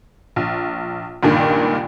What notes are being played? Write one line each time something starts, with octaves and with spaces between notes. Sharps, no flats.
A#1
C#2 G2 A#2 D#3